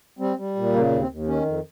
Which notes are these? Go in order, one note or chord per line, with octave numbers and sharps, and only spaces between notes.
G3 C4
G3
A#2
C#3 A#3
D#2
C4
D#2
D#3 C#4
F2